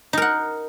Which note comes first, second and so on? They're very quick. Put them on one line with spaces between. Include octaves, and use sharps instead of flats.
D#4 A#4 F#5